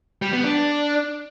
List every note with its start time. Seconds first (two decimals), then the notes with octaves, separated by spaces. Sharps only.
0.22 G3
0.33 B3
0.44 D4